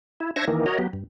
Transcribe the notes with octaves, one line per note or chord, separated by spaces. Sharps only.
E4
D4 C5 E5 C#6 G#6 A#6
D#3 E3 A#3
F#4 A#4 C#5 D#5
F#3 B3 G4
G2